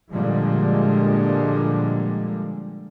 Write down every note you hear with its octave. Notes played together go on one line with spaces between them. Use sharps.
A#2 D3 F3 G3 G#3